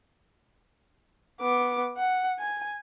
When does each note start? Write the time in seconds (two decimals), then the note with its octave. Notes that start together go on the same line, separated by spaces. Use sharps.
1.41 B3 D6
1.97 F#5
2.39 G#5